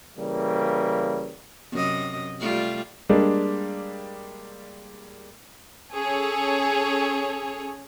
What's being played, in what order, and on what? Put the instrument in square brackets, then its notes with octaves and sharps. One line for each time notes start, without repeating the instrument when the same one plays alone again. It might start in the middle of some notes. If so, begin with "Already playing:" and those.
[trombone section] C#3 E3 G3 A#3
[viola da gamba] F#2 C3 D#5
G3 A3 F4
[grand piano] G3 G#3 A#3 D4
[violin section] C#4 G#4 A4 C#5